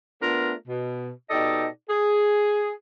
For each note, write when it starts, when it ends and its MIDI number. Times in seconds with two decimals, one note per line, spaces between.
0.22 0.53 57
0.22 0.53 59
0.22 0.53 62
0.22 0.53 65
0.22 0.53 69
0.22 0.53 70
0.68 1.10 47
1.31 1.67 47
1.31 1.67 63
1.31 1.67 67
1.31 1.67 69
1.31 1.67 74
1.31 1.67 75
1.89 2.72 68